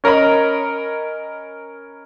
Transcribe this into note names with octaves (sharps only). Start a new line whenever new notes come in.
C#4 A#4 C#5 D#5 B5